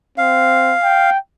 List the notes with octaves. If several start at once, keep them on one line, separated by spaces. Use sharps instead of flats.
C4 F5
G5